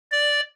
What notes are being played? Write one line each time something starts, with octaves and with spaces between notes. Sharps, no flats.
D5